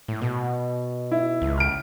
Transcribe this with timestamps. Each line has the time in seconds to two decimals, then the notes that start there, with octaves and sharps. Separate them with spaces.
0.08 A2
0.21 B2
1.11 E4
1.42 C#2
1.58 F6 D7